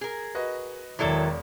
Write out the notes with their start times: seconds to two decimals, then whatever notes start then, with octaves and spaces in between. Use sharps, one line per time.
0.01 G#4 A#4
0.35 F#4 B4 D#5
0.99 E1 D#3 F#3 E4 A4 C#5 D5